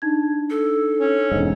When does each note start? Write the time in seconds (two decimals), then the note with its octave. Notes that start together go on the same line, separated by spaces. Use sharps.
0.02 D4 D#4 G#6
0.50 A4
0.99 C#4
1.32 E1 G#2